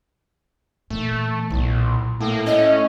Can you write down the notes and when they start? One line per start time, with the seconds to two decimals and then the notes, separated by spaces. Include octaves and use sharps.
0.91 A#2 E3 A3
1.50 B1 A#2 E4
2.20 A2 A#3
2.47 C#4 D#5